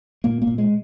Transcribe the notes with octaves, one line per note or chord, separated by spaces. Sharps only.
A#2 A#3
A#3
A#2
G#3